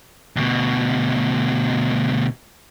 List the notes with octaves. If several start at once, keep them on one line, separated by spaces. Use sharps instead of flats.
D2 B2